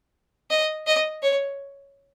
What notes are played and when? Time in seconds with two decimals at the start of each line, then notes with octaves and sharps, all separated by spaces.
0.50 D#5
0.87 D#5
1.23 C#5